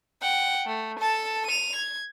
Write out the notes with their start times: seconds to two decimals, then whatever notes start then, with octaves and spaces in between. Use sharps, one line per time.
0.22 F#5 G5
0.66 A3
0.99 A4 A5
1.46 D#7 F7
1.75 G#6